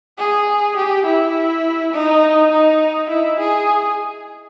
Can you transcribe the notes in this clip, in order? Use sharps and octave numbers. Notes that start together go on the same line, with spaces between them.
G#4
G4
E4
D#4
D#4
E4
G#4